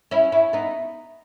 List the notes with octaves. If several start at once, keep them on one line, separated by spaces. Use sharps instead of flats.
C#4 E4
C#4 E4
B3 D#4